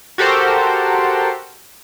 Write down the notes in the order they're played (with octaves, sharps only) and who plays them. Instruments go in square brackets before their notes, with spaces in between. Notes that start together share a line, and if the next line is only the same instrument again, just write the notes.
[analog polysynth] F#4 G4 A4 A#4 C5